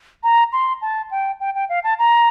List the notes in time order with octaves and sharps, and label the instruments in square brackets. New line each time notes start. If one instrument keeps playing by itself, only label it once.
[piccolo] A#5
C6
A5
G5
G5
G5
F5
A5
A#5